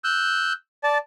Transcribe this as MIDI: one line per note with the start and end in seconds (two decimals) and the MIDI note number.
0.04 0.53 88
0.04 0.53 90
0.04 0.53 91
0.84 0.98 74
0.84 0.98 81